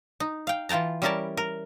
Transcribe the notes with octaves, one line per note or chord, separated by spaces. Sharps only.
D#4
F5 G5
E3 F4 G5 A5 A#5
G3 C#4 E4 A#4 D5 A5
A#4